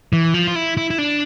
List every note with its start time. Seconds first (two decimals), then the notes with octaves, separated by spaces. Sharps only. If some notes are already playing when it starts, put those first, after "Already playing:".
0.13 E3
0.34 F3
0.47 F4
0.55 E4
0.77 E4
0.90 E4
0.98 D4